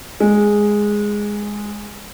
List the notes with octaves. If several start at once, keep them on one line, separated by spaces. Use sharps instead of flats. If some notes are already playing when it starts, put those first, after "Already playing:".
G#3